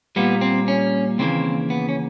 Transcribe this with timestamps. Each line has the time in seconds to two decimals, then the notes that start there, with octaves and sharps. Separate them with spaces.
0.16 A#2 G3 A#3 B3
0.41 C4
0.68 C#4
1.18 D#2 C#3 E3 G3 A#3 C4
1.70 B3
1.89 C#4